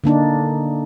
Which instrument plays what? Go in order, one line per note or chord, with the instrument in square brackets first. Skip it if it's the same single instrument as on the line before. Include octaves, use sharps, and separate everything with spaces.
[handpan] D3 A#3 D4 D#4